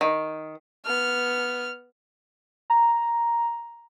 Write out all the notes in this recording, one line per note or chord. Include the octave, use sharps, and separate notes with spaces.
D#3
B3 F6
A#5